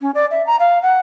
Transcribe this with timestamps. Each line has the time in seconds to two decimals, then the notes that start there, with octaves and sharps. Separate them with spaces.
0.01 C#4
0.14 D5
0.31 E5
0.47 A#5
0.60 F5
0.82 F#5